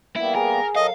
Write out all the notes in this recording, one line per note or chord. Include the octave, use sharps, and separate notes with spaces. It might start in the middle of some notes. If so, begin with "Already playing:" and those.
G3 A#3 B3 E4
G#4 A#4
F#3 A4 A#4 D#5 F5